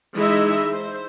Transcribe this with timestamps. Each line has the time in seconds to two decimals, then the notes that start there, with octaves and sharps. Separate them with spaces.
0.14 E3 G#3 D#4 E4 D#5 E5
0.73 C5